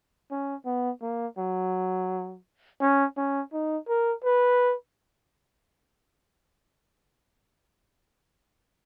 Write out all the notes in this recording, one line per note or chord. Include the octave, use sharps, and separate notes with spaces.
C#4
B3
A#3
F#3
C#4
C#4
D#4
A#4
B4